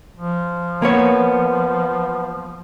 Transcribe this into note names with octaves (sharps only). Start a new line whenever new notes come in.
F3
A#3 B3 C#5